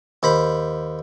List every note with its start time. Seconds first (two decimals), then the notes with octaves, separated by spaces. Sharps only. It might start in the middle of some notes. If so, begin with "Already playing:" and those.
0.23 D#2 C5 B5